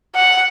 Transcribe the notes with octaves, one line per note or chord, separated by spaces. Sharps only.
F#5